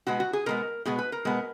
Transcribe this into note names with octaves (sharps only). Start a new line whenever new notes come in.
B2 G#3 B3 F#4
F#4
G#4
B2 G#3 B3 A#4
B2 G#3 B3 G#4
B4
A#4
B2 G#3 B3